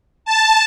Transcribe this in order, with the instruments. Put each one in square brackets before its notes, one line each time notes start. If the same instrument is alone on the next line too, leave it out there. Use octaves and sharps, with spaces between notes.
[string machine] A5